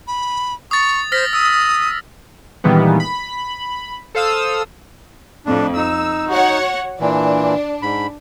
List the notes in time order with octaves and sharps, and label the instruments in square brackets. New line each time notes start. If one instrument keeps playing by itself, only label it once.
[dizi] B5
[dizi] C#6 [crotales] D#6 A6
[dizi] C5 [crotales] F6 A#6 B6
[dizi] D#6 [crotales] E6
[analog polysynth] A#2 D#3 E3 G3 G#3 B3
B5
A4 C5 F5 D#6 E6
[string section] F2 A2 [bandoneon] D4
[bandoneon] D#4 [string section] E6
[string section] F#4 C#5 F#5
[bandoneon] A#2 E3 [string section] D4
[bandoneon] G#2 B5